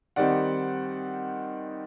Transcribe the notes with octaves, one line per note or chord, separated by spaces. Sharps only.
D#3 G3 C4 D#4 D5 F#5